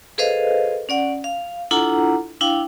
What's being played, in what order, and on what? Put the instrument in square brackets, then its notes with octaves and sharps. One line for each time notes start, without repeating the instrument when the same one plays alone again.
[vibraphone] G#4 A4 B4 C5 D#5 F5
C#4 D5 F#5
F5
D4 E4 F4 A4 F#5 A#5
D4 E4 F5 G5